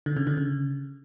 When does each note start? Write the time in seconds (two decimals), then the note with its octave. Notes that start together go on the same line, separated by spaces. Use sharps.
0.06 D3
0.17 C#3
0.27 D3
0.37 C#3